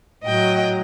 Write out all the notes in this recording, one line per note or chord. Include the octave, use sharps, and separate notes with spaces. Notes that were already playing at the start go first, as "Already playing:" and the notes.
A2 F#3 D#5 G5